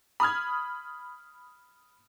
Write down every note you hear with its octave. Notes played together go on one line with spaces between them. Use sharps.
B5 D#6 F6 G#6